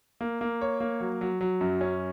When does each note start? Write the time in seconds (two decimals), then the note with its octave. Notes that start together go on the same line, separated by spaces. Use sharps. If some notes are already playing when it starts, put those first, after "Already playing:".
0.21 A#3
0.41 A#3
0.61 C#5
0.80 A#3
1.00 F#3
1.21 F#3
1.41 F#3
1.61 F#2
1.81 C#4